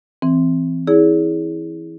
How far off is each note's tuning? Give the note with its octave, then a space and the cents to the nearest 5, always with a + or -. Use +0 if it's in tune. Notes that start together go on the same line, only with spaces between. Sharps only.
E3 +0 C4 +0
E4 -20 G#4 +0 D5 -40